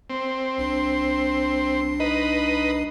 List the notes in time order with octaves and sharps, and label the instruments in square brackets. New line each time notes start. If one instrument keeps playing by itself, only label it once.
[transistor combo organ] C4
[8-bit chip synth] C2 D4 C7
[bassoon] D#4 [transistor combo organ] B4 D#5